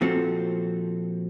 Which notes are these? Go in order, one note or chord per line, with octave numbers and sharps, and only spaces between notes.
A#2 F3 C4 F#4 A4